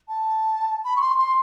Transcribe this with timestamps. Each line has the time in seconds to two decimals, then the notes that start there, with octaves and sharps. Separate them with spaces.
0.08 A5
0.84 B5
0.96 C#6
1.01 C6
1.18 C6